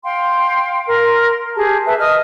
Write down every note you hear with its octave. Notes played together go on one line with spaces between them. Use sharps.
F5 G5 C6
A#4 C6
G4 G#4 A5
B4 E5 A5
D#5 D#6 F6